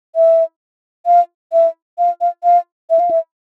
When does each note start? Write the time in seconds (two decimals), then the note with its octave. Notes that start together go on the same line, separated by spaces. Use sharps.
0.16 E5
1.06 F5
1.53 E5
1.98 F5
2.21 F5
2.44 F5
2.90 E5
2.99 F5
3.11 E5